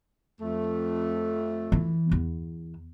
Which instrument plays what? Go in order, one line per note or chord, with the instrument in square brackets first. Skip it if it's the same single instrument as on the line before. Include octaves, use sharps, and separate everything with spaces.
[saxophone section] F2 A3
[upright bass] E3
E2